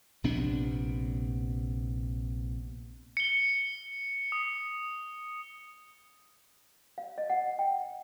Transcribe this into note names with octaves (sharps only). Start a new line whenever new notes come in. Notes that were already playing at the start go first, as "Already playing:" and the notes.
A#1 C3 B3 D4
C#7 G7
D#6
F5
D#5
F#5
G5